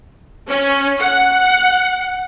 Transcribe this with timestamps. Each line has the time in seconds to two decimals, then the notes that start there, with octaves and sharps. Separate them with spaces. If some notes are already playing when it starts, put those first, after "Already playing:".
0.49 C#4
1.01 F#5